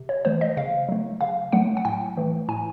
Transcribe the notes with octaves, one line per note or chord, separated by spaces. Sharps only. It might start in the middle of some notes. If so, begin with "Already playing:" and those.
Already playing: C3
C#5
E3 A3 C5
D#5
C#3 F5
F#3 A3
C#3 F5
F#3 A3 F#5
F#5
A2 G5
E3 A3
A2 G#5